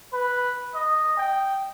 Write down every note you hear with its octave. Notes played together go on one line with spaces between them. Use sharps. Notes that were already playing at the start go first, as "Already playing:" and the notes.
B4
D#5
G5